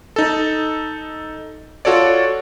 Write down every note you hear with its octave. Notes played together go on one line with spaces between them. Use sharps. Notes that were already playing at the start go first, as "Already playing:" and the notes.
D#4 A4
F4 F#4 A4 C#5 D5